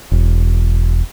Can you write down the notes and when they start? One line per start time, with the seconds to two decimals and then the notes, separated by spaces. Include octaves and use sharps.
0.12 E1